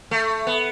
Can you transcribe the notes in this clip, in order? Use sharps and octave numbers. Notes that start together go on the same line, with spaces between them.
A3
B3